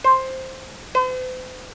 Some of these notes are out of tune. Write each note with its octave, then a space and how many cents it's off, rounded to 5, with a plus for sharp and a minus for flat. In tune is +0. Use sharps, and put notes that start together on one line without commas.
C5 +5
C5 -45